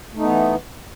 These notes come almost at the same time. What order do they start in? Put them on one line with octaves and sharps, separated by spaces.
A3 D#4 B3 E3